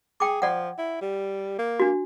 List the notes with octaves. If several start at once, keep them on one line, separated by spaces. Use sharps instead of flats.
G#4 G5 D6
F3 D5 F#5
E4
G3
A#3
D4 F#4